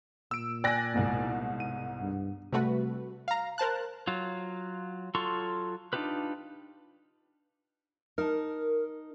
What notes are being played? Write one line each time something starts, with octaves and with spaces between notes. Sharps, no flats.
A#2 E6 D7
D5 G5 G#5 F#6 A#6
C2 G#2 B2
D#7
G2
C3 G3 A3 F#4 B4
F5 A#5
A#4 C5 A5 F#6
F#3 F4
F#3 F4 A4 C6 C#6
D4 D#4 F4 G4 B4
D#4 A#4 A5